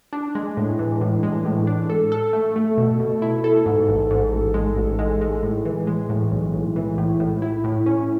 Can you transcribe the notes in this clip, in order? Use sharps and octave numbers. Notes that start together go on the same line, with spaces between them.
D4
G#3
A2
E3
A2
G#3
A2
D4
A4
A4
A3
A3
B2
B2
E4
A4
G#2
A1
G#2
A1
G#3
A1
G#3
G#3
A2
E3
G#3
A2
B1
B1
E3
A2
A2
E4
A2
C#4